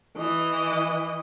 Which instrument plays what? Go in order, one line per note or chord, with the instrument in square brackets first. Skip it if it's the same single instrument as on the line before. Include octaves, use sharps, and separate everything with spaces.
[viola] E3 D#5